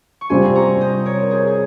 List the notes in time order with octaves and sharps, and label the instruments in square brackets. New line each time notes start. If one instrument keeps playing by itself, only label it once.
[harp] C#6
[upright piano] C3 G3 C4 F4 [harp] G#5 C6
[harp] C6
A#5 C#6
C5 D#5
A#4 C#5
G#4 C5
G#4